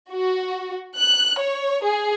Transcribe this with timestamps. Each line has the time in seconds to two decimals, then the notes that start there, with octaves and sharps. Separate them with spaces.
0.11 F#4
0.96 F#6
1.38 C#5
1.83 G#4